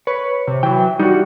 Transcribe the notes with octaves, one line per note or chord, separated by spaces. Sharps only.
B4 C#5
C3
E3 F#3 G5
G3 D#4 F#4